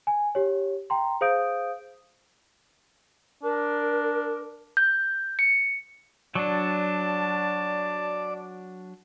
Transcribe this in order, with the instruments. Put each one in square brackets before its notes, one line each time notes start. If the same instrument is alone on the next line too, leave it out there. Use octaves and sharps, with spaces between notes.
[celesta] G#5
G4 C#5
G5 A#5 C6
G#4 C5 F5 D#6 G6 D7
[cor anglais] D4 [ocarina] A#4
[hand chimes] G6
C#7
[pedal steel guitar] F#3 D4 [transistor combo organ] D5 D6 [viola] A5